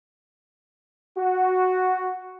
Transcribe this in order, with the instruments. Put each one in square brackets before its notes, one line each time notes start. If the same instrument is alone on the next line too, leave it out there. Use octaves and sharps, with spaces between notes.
[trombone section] F#4